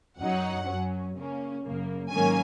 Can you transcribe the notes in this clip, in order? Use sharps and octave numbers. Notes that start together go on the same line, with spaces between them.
F#2 F#3 D#4 F#5
F#2 F#3 C#4
C#3 A#3 C#4
F#2 C#3 A#3
G#2 D#3 F#3 A#3 C#4 G#5